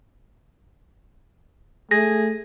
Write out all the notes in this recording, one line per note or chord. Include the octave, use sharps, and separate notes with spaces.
A3 G#4 A#6